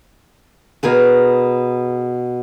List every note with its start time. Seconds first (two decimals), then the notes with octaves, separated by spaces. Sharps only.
0.83 B2 G#4 A#4 B4